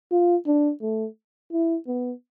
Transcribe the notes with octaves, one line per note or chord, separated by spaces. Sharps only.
F4
D4
A3
E4
B3